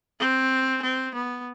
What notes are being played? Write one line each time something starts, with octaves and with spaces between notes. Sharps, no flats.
C4
C4
B3